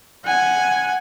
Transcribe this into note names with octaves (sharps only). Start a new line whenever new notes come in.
F#5 G#5